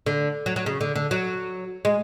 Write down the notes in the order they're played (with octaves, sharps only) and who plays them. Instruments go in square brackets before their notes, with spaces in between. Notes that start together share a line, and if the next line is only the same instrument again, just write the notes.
[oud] D3
F#3
F#3
C#3
D3
D3
F#3
G#3